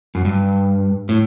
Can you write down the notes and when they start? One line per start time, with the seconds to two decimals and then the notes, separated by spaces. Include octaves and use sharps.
0.15 F#2
0.25 G2
1.09 A2